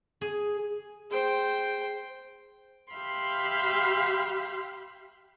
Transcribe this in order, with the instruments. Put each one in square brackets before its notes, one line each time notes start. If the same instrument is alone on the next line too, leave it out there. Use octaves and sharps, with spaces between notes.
[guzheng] G#4
[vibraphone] G#4 [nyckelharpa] C5 G5
[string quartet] G4 E5 F5 B5 C6